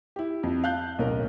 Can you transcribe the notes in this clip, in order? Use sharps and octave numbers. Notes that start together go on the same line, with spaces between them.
E4 G4
F2
F5 A5 F#6 G6
D1 B1 C#4 A#4